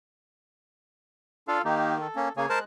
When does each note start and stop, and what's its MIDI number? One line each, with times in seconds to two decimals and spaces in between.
1.48 1.59 62
1.48 1.62 65
1.48 1.62 69
1.48 1.62 77
1.65 2.07 51
1.65 1.98 58
1.65 1.98 63
1.65 1.98 67
2.01 2.33 69
2.16 2.29 58
2.16 2.29 61
2.37 2.46 49
2.37 2.46 58
2.37 2.49 68
2.37 2.49 73
2.37 2.49 80
2.49 2.64 56
2.49 2.59 70
2.49 2.59 72
2.49 2.59 81
2.49 2.64 90